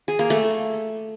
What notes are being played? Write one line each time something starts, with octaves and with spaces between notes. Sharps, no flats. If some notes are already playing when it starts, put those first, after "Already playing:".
G#4
A#3
A3